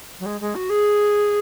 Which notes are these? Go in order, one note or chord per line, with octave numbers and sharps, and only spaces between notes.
F#3
G#3
G#3
F#4
G#4